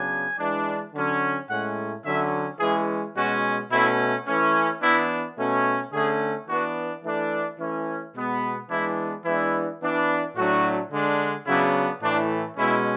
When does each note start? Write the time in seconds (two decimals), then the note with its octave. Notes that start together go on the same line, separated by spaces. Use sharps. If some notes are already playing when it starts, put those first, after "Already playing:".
Already playing: C#3 F#3 B3 D4 G#5
0.39 E3 G#3 D4
0.94 D3 F#3 C#4
1.49 A2 G#3 C#4 F#5
2.05 D3 F#3 C#4 E5
2.60 E3 G#3 C#4 G#4
3.16 B2 G#3 C#4 F#4
3.71 B2 A3 C#4 E4
4.27 E3 A3 C#4
4.82 E3 B3 D4 E4
5.38 B2 A3 C#4
5.93 D3 A3 C#4 G#4
6.48 E3 B3 D4 F#4
7.03 E3 A3 D4
7.60 E3 A3 C#4
8.14 B2 G#3 B3
8.70 E3 G#3 B3 D4 E4
9.25 E3 G#3 B3 D4 E4
9.81 E3 B3 D4
10.36 A2 F#3 A3 D4 F#4
10.92 D3 G#3 D4
11.47 C#3 F#3 B3 D4 E4
12.02 A2 E3 A3 D4
12.57 B2 G#3 C#4 E4